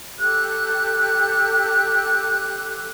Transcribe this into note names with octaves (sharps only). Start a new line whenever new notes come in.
G4 A4 F#6